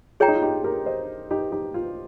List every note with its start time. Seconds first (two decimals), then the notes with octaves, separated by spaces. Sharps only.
0.20 F4 G#4 C#5 G5 A#5
0.28 D#4
0.35 F4
0.42 D#4 G4
0.64 G4 A#4
0.86 C5 D#5
1.31 D#4 G4
1.52 D#4 G4
1.74 F4